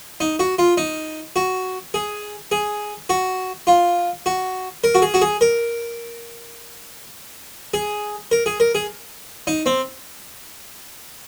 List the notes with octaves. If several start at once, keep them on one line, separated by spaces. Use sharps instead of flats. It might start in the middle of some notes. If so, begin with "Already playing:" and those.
D#4
F#4
F4
D#4
F#4
G#4
G#4
F#4
F4
F#4
A#4
F#4
G#4
F#4
G#4
A#4
G#4
A#4
G#4
A#4
G#4
D#4
C4